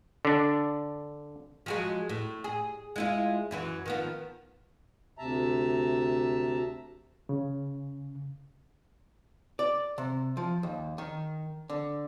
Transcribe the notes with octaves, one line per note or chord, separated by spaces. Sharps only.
D3 D4
F3 F#3 G#3
A2
G#4
G#3 E4 F4
F#2 E3 F#3
D#3 F3 B3
D2 C3 E5 A5 A#5
C#3
D5
C3
F3
D#2
D#3
D3